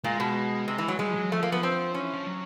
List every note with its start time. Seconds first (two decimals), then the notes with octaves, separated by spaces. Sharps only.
0.04 A#2 G#3
0.20 B2
0.68 C3
0.78 E3
0.88 F#3
0.99 G3 G#3
1.10 F3
1.15 F#3
1.31 F3 A3
1.43 A#3
1.52 B3
1.63 C4
1.94 E3 C#4
2.13 F3
2.27 F#3